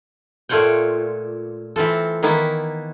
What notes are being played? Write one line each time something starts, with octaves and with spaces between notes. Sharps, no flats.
A#2 A3 F4 C#5 F#5 G5
E3 C4 F4 A4
D#3 E3 A#3 B3 E4